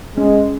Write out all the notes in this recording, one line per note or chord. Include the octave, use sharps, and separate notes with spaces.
G#3 C#4